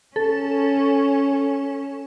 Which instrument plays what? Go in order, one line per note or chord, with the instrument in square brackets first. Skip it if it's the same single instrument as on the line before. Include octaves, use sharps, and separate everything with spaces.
[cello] C#4 [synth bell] A4